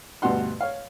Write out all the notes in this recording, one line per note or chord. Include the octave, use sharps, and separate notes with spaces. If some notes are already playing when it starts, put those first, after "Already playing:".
D2 G2 B2 F#4 F#5 C6
C#5 F5